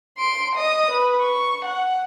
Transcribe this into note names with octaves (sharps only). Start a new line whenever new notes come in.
C6 D7
D#5 D#6
B4
C#6
F#5